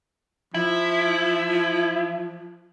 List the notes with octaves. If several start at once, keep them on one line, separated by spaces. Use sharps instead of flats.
F3 E4